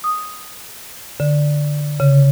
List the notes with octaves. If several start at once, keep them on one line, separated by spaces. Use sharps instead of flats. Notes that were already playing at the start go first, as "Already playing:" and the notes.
D#6
D3
C#3